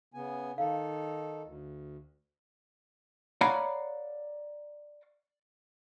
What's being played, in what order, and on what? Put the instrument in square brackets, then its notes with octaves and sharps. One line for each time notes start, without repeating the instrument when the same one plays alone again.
[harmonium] C#3 B3 G#5
[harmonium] D#3 D#4 A4 [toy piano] F5
[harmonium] D2
[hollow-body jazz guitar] C#5 D5 F5 F#5 A#5 B5